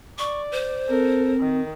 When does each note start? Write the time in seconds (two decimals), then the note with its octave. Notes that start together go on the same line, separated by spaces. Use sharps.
0.18 D5 C#6
0.52 C5
0.89 C4 A4 A#4
1.40 D#3